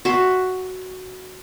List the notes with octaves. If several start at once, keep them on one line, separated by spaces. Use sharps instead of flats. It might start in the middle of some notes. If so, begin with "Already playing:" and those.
F#4 E5 C6